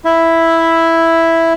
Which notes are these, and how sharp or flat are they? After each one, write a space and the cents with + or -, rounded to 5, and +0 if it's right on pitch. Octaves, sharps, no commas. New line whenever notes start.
E4 +0 E5 +0